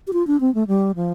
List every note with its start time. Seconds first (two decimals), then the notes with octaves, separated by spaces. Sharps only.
0.07 G4
0.13 F4
0.27 D4
0.40 C4
0.55 A3
0.67 G3
0.96 F3